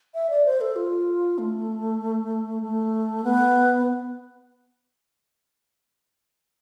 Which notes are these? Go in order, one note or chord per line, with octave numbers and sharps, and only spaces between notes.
E5
D5
C5
A4
F4
A3
A3
B3